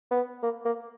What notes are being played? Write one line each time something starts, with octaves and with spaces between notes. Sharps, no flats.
B3
A#3
A#3